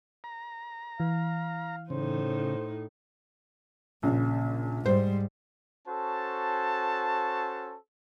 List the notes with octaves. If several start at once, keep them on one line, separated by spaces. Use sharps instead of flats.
A#5
E3 F5
A2 C#3 D#4 C5
A#1 A#2 C#3
G#2 G3 C5
C#4 F#4 A4 C5 A5